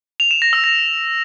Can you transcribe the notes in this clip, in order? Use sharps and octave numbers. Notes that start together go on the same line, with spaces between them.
F7
E7
A#6
E6
A#6